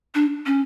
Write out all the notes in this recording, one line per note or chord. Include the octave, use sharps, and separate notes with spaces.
D4
C#4